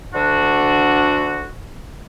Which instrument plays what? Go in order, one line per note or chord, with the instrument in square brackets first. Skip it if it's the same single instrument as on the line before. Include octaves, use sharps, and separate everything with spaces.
[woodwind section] D2 D3 D4 F#4